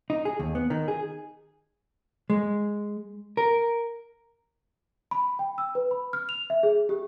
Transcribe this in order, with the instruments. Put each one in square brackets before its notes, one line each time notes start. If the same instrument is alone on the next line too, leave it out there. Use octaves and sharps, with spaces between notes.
[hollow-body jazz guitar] D#4
G#4
D#2
B3
D#3
G#4
G#3
A#4
[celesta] B5
G5
E6
B4
B5
F6
F7
E5
G#4
G4